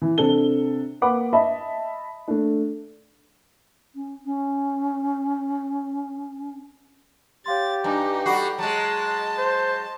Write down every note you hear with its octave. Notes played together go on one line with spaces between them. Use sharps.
E3
C3 C4 D4 A4 G7
A#3 B4 F#5 B5 D6
D#5 E5 A5 B5
A3 D4
C#4
C#4
G4 C#5 F5 C6 A6
G2 D#4 G#5 A#5 D6
G3 F#4 A4 B5 C7
F#3 G#3 D#5 A5 A#5
C5